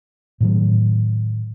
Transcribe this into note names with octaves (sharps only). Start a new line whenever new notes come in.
A2 D#3 F#3